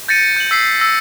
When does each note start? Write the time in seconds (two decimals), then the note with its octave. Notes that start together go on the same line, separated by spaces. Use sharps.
0.08 G6 A6 A#6 C#7 D#7
0.37 G6 F#7
0.51 E6 B6 C7
0.80 E6 A#6